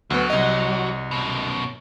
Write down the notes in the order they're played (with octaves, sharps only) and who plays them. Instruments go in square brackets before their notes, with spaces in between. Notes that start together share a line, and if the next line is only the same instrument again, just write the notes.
[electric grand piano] D2 B3 [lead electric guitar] F#3
[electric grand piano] C2 D#5
[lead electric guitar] F#2 B2